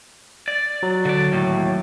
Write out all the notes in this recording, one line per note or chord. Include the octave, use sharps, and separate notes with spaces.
D5
F#3
D3 D5
D#2 A2